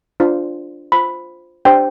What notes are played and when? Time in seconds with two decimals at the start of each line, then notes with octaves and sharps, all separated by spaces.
0.20 D4 F4 C5
0.92 F4 C5 B5
1.65 D4 G4 C5 G5